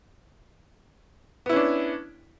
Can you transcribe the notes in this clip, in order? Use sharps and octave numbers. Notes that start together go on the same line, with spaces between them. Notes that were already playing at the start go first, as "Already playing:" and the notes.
B3 C#4 D4 E4